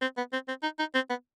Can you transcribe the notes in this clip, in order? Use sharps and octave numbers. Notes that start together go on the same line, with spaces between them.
C4
B3
C4
C4
D#4
D#4
C4
B3